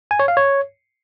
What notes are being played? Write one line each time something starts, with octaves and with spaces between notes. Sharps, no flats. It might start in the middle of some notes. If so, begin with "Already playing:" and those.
G#5
C#5
F5
C#5